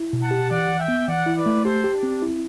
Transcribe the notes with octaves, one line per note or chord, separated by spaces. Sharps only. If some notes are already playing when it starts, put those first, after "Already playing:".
Already playing: E4
B2
F#5 A5
G4
E3 D5 F#5
E3
E5 G5
B3
E3 D5 F#5
E4
B4 D5
A3
G4 A4 C5
G4
D4
C4
E4